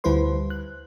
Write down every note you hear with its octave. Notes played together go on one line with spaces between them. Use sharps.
D2 G3 E4 B4 C5 C6
F#6